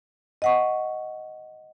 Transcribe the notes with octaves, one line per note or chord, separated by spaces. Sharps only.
D#5 F#5 C#6